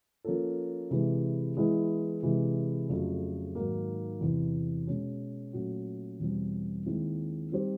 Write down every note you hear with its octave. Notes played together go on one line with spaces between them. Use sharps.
F3 A#3 C#4 F4 A4
C3 E3 G#3
E3 G#3 B3 E4
C3 E3 G#3
F2 C#3 F#3 A3
G#2 D#3 F#3 A#3
E2 C3 E3
B2 G#3 C#4
A#2 F#3 A3 C#4 F#4
E2 B2 G3 C4
D#2 D#3 G#3 C4 E4
G3 C4 D#4 G4 C5